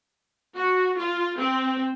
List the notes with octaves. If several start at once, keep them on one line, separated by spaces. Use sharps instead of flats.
F#4
F4
C4